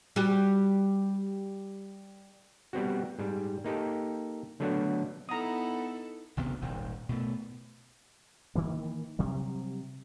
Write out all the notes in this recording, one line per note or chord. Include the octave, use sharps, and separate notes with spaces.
G3 F#4 G4
G3 B3 C4 F#4
G#2 G3
A#3 D#4 G4 A4
D3 F#3 A3 B3 D4 F#4
B3 D#4 E4 A4 A#5 D#6
G#1 D2 C3 B3
D#1 G#1 G#2
B2 A3
D#3 E3 A#3
C3 F#3 G3